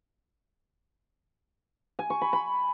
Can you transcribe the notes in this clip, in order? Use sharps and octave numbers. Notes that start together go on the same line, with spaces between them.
G#5
C#6
B5
B5